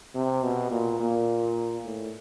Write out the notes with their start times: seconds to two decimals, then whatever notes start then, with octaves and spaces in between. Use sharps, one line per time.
0.15 C3
0.43 B2
0.71 A#2
1.00 A#2
1.85 A2